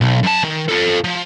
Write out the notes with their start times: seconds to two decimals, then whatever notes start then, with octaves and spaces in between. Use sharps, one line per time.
0.01 B1
0.24 F#2 A5
0.44 D#3
0.69 F4 A4
1.04 F3